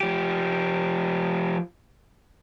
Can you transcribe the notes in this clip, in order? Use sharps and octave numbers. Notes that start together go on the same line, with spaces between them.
F3 G4